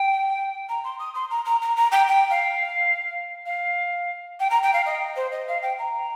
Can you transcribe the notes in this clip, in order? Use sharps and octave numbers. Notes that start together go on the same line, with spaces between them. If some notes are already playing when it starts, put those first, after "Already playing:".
Already playing: G5
A#5
C6
D#6
C6
A#5
A#5
A#5
A#5
G5
G5
F5
F5
G5
A#5
G5
F5
D#5
C5
D#5
F5
G5
A#5